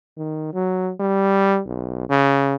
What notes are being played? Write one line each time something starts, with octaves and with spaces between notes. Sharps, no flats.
D#3
F#3
G3
B1
C#3